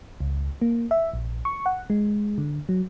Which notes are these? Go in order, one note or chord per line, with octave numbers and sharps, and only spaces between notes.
C#2
A#3
E5
A#1
C#6
F#5
G#3
D3
F#3